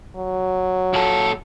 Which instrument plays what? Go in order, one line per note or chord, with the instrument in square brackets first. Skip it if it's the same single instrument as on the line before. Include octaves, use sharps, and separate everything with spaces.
[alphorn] F#3
[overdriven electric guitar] A#2 A4